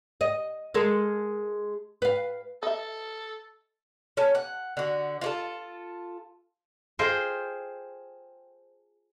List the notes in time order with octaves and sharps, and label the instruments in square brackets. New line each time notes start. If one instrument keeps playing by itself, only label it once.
[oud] D#5
G#3 A4 A#4
B4 F5
[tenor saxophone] A4 [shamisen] D#5 E5
[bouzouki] C#4 A4
F#5
D3 F#4
F4 F#4 A4
[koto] F4 G#4 A4 C5 D#5 G5